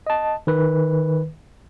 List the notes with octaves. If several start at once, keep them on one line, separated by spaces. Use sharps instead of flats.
D#5 A5
D#3 B4